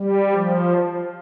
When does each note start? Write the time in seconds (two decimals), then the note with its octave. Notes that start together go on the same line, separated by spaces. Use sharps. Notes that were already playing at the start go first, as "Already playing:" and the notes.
Already playing: G3
0.32 F3